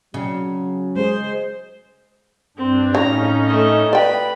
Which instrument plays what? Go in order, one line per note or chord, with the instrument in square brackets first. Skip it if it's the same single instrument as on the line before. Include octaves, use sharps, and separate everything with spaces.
[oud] C#3 [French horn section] F#3
[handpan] G#3 G#4 [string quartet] C5
[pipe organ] G2 D4 [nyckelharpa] C4
[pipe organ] A2 C#4 D#4 [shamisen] C#3 [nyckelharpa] A#5
[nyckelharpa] A3 D#5
[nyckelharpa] B4 B5 [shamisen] D5 G5